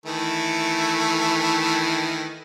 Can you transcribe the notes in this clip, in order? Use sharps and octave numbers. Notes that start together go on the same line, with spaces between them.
D#3 E3 A3